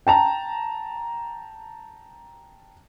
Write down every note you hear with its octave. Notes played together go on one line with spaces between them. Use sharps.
G5 A5 A#5